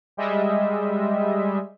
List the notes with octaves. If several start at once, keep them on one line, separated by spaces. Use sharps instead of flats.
G3 G#3 D#5 E5